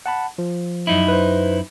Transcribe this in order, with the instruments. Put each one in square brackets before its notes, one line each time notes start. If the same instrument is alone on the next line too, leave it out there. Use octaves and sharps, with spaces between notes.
[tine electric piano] F#5 A5 B5
F3
[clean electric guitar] F#2 D#4 E4
[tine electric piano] B4 C5